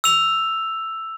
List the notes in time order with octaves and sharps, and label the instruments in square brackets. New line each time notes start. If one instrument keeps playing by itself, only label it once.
[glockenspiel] E6 F7